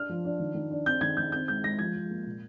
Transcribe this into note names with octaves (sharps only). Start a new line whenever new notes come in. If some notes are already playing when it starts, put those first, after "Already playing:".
Already playing: D4 F6
F3
D4
D#3
D#3
D4
C4 G6
D#3 G#6
D#3 G6
C4 G6
G#3 G6
G#3 A#6
F3 G#6
F3
A#3
A#2